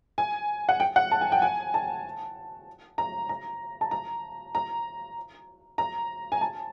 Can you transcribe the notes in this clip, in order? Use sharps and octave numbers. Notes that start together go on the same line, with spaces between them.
G#5
F#5
G5
F#5
A5
G#5
G5
G#5
A5
A#5
A#5
A5
A#5
A#5
A#5
G#5
A5